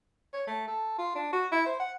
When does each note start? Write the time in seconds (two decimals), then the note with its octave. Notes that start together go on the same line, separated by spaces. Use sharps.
0.33 C#5
0.47 A3
0.67 A4
0.98 F4
1.15 D4
1.33 F#4
1.52 E4
1.66 C5
1.80 F#5